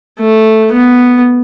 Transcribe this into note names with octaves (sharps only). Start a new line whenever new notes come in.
A3
B3